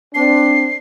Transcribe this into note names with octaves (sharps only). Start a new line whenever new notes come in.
C4 D4 C7